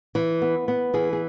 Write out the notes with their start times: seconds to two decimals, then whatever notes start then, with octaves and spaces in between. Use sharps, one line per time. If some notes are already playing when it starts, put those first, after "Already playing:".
0.15 E3
0.42 B3
0.68 B3
0.94 E3 G#4
1.13 G#4